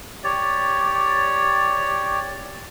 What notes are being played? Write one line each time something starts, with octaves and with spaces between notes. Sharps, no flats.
G4 C#5 D5